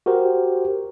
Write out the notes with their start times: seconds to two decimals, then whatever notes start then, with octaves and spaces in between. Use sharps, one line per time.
0.06 F#4 G4 A#4 C5